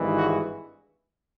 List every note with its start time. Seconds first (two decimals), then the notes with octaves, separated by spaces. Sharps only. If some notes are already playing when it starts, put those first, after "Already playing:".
Already playing: G#1 G2 E3 G#3
0.17 F#4